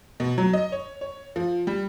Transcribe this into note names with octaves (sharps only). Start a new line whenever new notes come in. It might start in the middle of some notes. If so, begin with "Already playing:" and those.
B2
F#3
D#5
C#5
C#5
F3
G3